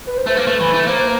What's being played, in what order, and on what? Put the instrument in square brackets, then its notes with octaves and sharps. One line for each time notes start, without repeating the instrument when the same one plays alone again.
[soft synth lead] B4
C5
[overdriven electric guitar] A3 [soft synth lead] B4
[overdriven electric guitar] A#3
A3
E3
A3
[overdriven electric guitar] A#3 [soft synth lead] C5
[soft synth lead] B4